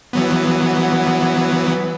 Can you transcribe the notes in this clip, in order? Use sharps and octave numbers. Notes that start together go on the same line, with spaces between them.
E3 F#3 B3